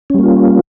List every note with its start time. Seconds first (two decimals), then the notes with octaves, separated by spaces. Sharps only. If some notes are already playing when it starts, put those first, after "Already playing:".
0.10 C#4
0.14 G3
0.19 A#3
0.23 F4